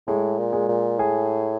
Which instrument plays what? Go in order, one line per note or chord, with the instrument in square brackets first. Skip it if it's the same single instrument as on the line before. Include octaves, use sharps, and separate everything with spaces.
[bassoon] A2 [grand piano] G#3
[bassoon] A#2
[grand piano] G#3
[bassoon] A#2
[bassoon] A2 [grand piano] G#4